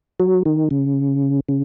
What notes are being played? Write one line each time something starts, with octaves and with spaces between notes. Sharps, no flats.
F#3
D#3
C#3
C#3